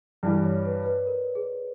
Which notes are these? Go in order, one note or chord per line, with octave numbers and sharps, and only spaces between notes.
G2 E3 G3 D5
C#5
B4
B4
A#4
G#4